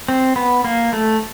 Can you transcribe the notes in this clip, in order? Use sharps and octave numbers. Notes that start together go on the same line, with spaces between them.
C4
B3
A#3
A3